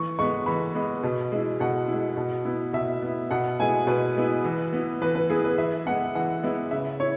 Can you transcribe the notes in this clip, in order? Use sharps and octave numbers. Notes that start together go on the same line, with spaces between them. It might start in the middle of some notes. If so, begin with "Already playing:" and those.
Already playing: E3 C#6
G#3 B3 C#6
E3 B5
G#3 B3
B2
G#3 E4
B2 F#5
G#3 E4
B2
B3 E4
B2 E5
B3 E4
B2 F#5
G#3 B3 E4 G#5
B2 B4
G#3 B3 E4
E3
B3 E4
E3 B4
B4
B3 E4 G#4
B4
E3 E5
G#3 B3 E4 F#5
E3 F#5
G#3 B3 E4
C#3 E5
E4 C#5